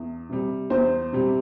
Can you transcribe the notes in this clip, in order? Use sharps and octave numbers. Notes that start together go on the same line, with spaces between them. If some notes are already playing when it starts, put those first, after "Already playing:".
Already playing: E2
C3 G3
E2 C5
C3 G3